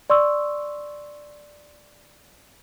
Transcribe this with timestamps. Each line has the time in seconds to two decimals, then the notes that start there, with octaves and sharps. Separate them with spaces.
0.10 D5 C6 C#6 E6